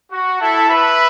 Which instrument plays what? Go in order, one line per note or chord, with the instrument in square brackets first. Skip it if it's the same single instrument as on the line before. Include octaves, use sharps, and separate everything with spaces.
[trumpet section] F#4
[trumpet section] E4 A4 [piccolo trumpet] A5
[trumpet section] B4 E5 [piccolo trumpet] B5